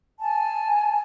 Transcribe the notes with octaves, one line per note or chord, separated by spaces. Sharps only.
G#5 A5